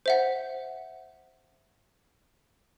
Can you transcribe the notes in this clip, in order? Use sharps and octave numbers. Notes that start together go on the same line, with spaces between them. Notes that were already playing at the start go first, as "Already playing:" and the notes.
C5 E5 F#5